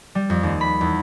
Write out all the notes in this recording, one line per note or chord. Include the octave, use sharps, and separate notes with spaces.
G3
F2
D#2
B5
E2